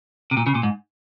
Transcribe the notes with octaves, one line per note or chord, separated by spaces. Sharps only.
C3
A#2
C#3
A#2
G#2